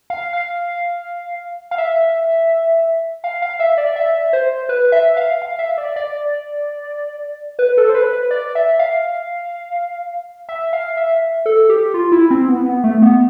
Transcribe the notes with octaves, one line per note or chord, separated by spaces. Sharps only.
F5
F5
F5
E5
F5
F5
E5
D5
E5
C5
B4
E5
F5
F5
E5
D5
D5
B4
A4
C5
B4
B4
D5
E5
F5
E5
F5
E5
A4
G4
F4
E4
C4
B3
B3
A3
B3